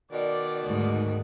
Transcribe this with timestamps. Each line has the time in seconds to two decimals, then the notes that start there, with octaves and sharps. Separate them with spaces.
0.12 B2 D#3 D5
0.64 D2 G#2